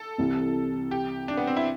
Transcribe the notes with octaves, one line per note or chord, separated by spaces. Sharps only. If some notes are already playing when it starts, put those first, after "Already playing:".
Already playing: A4
C2 C3 E3
G4
D4
B3
C4
E4